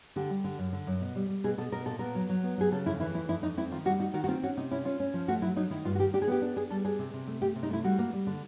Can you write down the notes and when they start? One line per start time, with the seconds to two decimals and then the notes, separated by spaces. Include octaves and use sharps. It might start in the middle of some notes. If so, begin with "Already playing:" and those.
0.16 D3 G4
0.30 G3
0.44 D3
0.59 F#2
0.73 D3
0.87 F#2
1.01 B2
1.16 G3
1.29 G3
1.44 B2 G#4
1.58 B2 A4
1.72 B2 A#4
1.86 A#2 A4
1.99 B3 A#4
2.15 F#3
2.29 F#3
2.43 B3
2.58 F#3 G#4
2.72 C#3 A4
2.86 F2 E4
3.00 E3 E4
3.14 F2 E4
3.28 F2 E4
3.43 F2 D#4
3.57 C4 E4
3.71 D#3 F4
3.85 G3 F#4
3.99 D#4 F#4
4.14 D#3 F#4
4.24 F#4
4.28 C4 F4
4.43 C#4 F#4
4.57 C3 D#4
4.71 C#4 E4
4.85 C#4 F4
5.00 C#4
5.14 F3
5.28 A3 F#4
5.42 F#3 E4
5.56 F#3 D#4
5.70 D#3 E4
5.85 G2 F4
5.95 F#4
5.99 D#3 G4
6.13 D4 G4
6.22 G#4
6.28 B3 G4
6.42 D4
6.56 D4 G#4
6.70 G3 A4
6.85 D4 G#4
6.99 C3
7.13 C3
7.27 A3
7.42 A3 G4
7.56 C3
7.63 D#4
7.70 A3 E4
7.84 G3 F#4
7.99 A#3
8.13 G3
8.27 D3